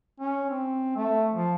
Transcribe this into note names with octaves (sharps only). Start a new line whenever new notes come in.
C#4
C4
A3
F3